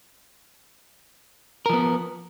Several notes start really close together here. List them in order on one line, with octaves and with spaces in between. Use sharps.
A#4 F3 B3